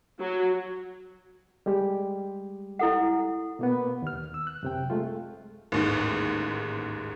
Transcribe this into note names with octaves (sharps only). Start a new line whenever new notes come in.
F#3
G3 G#3 G4
E4 A4 F#5
B2 A#3 B3
D#2 F6
E6
F#6
F#2 C3 G5
G#3 A3 F4
A1 D#2 G#2